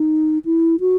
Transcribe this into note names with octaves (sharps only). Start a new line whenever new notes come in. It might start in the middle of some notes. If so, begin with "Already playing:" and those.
Already playing: D#4
E4
F#4